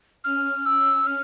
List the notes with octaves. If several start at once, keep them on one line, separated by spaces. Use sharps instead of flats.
C#4 F6
E6
F6